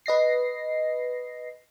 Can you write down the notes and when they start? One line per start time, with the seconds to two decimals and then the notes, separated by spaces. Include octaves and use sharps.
0.06 B4 D#5 A#6 C7